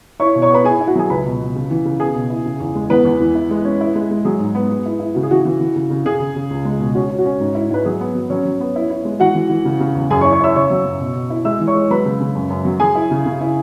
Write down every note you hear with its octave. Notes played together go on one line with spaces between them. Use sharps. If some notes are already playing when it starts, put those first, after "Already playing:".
E4 C#5 C#6
B2
C#5 C#6
B3 B4 B5
E4 G#4 G#5
E4
F#4 F#5
F#3 G#4 G#5
C#2 B4 B5
B2
B2
C#3
E3
C#3
B3 G#4 G#5
B2
E4
C#3
E2
G#3
E3 B3 B4
E2
E3
E4
G#3
C#4
E4
G#3
G#3
F#3 G#4
G#2
B3
B3
E4
E4
C#3 F#4
G#4
E3 F#4
E3
E3
C#3
C#3
C#3 G#4
C#3
C#3
C#2
G#3
B2
C#4 F#4
C#4
F#4
C#4
G#2
E4
G#2 B4
F#3 G#4
B3
F#3
F#3 C#4 C#5
F#3
B3
E4
E4
G#3
E3 F#4 F#5
E3
E3
C#3
C#3
E2
F#2 G#4 G#5
C#5 C#6
E4
C#5 C#6
E4 E5 E6
C#3 C#5 C#6
F#3
F#2
B2
B2
E4
G#3 E5 E6
E3
C#5 C#6
G#3
F#3 B4 B5
C#3
C#3
F#2
F#2
F#3
F#3 G#4 G#5
E4
C#3
C#3
E4